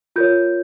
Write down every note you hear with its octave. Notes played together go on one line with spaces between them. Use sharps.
F4 A#4 C#5 G6